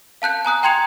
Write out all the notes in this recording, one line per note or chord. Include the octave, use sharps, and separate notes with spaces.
F5 A5 F#6 G6
G#5 A#5 D#6 F#6
G5 A#5 C6 G#6 C#7 F7